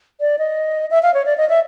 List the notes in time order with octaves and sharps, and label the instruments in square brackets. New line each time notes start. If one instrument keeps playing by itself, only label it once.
[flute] D5
D#5
E5
F5
C#5
D5
D#5
E5